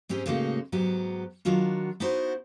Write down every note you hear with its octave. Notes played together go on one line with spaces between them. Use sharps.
G#2 C4 C#4 G4 G#4
A2 C#3 G#3 A#3 D#4 F#4
G#2 F#3 B3 G4
D#3 F#3 D4 F4 F#4
B3 D#4 E4 F#4 C5